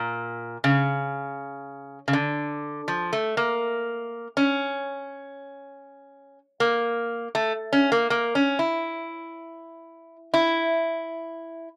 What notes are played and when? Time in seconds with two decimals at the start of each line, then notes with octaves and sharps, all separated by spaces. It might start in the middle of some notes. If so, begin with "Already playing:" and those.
Already playing: A#2
0.64 C#3
2.08 C#3
2.13 D3
2.88 F3
3.13 A3
3.37 A#3
4.37 C#4
6.60 A#3
7.35 A3
7.73 C#4
7.92 A#3
8.10 A#3
8.35 C#4
8.59 E4
10.34 E4